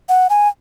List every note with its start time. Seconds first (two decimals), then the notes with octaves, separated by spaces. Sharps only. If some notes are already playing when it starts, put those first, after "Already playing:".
0.09 F#5
0.30 G#5